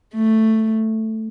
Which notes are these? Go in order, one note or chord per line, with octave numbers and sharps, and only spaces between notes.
A3